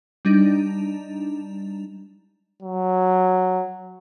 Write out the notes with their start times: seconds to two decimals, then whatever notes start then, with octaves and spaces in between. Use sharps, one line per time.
0.25 G3 D4 D#4
2.62 F#3